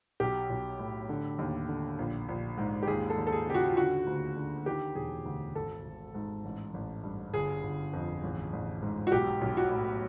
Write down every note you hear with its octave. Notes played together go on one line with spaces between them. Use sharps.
B1 G4
B1
A2
D3
D#2
D3
A#1
A#1
G#2
G4
D#2 G#4
A4
D#2
A4
G#4
C#3 G4
F#4
F4
D3 F#4
D2
D3
D#3 G4
E1 G#4
D2
G#1 A4
G#1
G#2
A1
A1
G2
G1 G#4
G1
F2
A1
A1
G#2
F#4
B1 G4
B1
F#4
A2